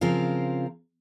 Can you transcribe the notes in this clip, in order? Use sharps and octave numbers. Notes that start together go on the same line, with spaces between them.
C#3 F3 C4 F4 A#4